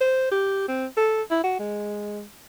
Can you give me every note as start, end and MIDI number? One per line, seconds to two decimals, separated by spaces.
0.01 0.29 72
0.31 0.67 67
0.68 0.86 60
0.97 1.22 69
1.31 1.41 64
1.44 1.55 66
1.59 2.24 56